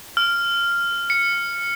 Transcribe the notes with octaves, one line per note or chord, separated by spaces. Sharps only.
F6
C#7